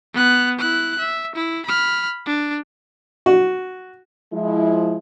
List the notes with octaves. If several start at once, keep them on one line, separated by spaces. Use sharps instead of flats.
B3 F#6
E4 F#6
E5
E4
B5 F6
D4
F#4
F3 G#3 E4